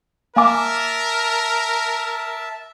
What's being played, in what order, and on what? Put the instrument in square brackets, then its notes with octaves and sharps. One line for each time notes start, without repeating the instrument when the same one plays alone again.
[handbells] A#3 G#5 D6 [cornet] A#4 [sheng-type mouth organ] E5 A5